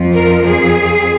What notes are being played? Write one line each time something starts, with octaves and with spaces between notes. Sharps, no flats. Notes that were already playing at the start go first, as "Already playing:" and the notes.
Already playing: F2 F3 C4
A#4
G#4